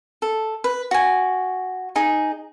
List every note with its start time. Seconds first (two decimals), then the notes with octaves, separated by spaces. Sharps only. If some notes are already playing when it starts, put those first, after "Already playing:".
0.22 A4
0.64 B4
0.91 F#4 G#5
1.96 D#4 G#4